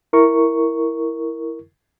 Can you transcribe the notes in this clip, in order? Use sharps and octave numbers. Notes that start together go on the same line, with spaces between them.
E4 A#4 C#6